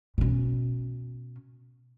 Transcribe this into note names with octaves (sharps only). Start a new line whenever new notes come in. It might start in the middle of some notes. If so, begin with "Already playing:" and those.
B2 C#4